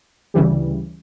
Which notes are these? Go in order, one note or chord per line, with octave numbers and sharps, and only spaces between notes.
D2 C#3 E3 G3